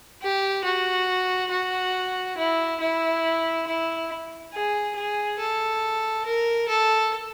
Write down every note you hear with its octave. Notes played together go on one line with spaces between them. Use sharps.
G4
F#4
F#4
E4
E4
E4
G#4
G#4
A4
A#4
A4